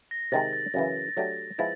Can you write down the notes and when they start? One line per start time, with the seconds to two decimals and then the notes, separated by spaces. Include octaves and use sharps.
0.11 A#6
0.32 C3 D#3 G#3 C4 A6
0.53 A6
0.74 F#2 C#3 E3
1.17 F#3 A3 D4 G4
1.58 F3 G#3 B3 E4 A6